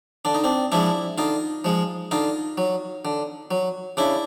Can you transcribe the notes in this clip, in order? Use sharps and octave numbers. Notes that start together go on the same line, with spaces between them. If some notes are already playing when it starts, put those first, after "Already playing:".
D3 D4
D#4
C4 D4
F3 G#3 D4 E4
D3 D#4 F4
F3 G#3
D3 D#4 F4
F#3
D3
F#3
C#3 D4 E4